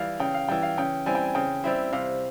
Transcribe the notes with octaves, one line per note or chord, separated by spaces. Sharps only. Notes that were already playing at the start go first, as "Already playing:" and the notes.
Already playing: E3 G3 F5
C#3 G5
F5
E3 G3 G5
F5
C#3 G5
G3 C4 E4 G#5
G5
G#5
C#3 G5
G3 C4 E4 E5
C3 F5